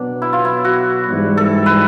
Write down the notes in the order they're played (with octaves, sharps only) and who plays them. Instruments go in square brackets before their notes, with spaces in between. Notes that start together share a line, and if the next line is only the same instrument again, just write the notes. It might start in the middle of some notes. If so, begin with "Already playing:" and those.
Already playing: [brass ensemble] B2 F#3 B3 [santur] D4
[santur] E4
F4
E4
F#4
[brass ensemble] G#2 E3 G3
[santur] A4
B4